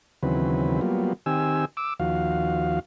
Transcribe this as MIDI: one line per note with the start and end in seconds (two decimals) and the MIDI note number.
0.23 0.81 39
0.23 0.81 49
0.23 0.81 52
0.23 0.81 54
0.23 0.81 60
0.23 0.81 71
0.81 1.13 54
0.81 1.13 55
0.81 1.13 58
0.81 1.13 59
0.81 1.13 65
1.26 1.65 51
1.26 1.65 60
1.26 1.65 67
1.26 1.65 80
1.26 1.65 88
1.77 1.94 86
1.77 1.94 88
2.00 2.79 39
2.00 2.79 53
2.00 2.79 66
2.00 2.79 77